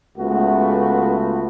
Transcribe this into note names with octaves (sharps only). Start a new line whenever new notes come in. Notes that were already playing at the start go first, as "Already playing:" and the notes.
C#2 A3 B3 F4 F#4